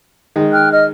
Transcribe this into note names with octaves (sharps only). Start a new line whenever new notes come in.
D#3 G#3
G5 F6 F#6
D#5 F6